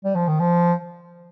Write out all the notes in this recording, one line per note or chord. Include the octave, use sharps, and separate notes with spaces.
G3
F3
D#3
F3